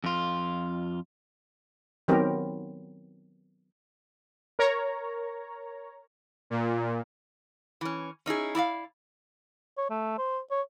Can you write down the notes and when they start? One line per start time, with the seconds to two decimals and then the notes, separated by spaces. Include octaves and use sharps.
0.04 F2 F4
2.08 D#3 F#3 B3 C4 G4 A#4
4.59 A#4 C#5 A#5
6.50 A#2
7.81 E3 C#4
8.26 C#4 D#4 E4 G#4
8.55 E4 D5 D#5 F5
9.77 C#5
9.90 A3
10.18 C5
10.51 C#5